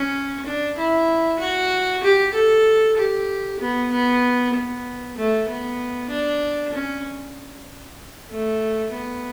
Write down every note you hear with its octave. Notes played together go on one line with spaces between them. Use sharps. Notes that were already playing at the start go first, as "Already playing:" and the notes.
Already playing: C#4
D4
E4
F#4
G4
A4
G4
B3
B3
B3
A3
B3
D4
C#4
A3
B3